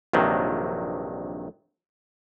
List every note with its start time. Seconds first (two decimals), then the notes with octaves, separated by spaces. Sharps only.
0.13 A#1 G2 C3 D#3 F#3